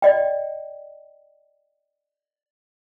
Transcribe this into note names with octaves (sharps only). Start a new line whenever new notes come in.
D5 D#5 G5